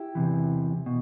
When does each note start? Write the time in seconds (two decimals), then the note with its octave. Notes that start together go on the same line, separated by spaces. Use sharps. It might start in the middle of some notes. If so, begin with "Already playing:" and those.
Already playing: E4 G4
0.15 E2 C3 E3
0.86 B2